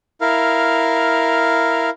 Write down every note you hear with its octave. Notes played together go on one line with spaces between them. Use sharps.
E4 A#4 F5